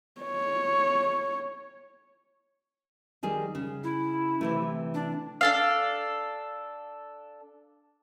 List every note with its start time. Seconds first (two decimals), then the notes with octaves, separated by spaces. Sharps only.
0.21 C#5
3.23 D#3 G3 G#4
3.55 C#3
3.84 E4
4.41 C3 E3 A3
4.94 D4
5.41 D4 A4 F5